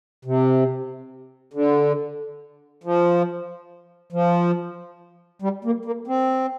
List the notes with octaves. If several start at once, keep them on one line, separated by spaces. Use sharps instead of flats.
C3
D3
F3
F3
G3
A#3
A#3
C4